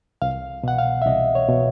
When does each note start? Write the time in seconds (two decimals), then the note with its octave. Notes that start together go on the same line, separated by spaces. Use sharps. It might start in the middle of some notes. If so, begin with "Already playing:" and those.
0.22 C2 F5
0.63 B2 F#5
0.79 F5
1.02 E5
1.06 C2 D#5
1.35 C#5
1.48 B2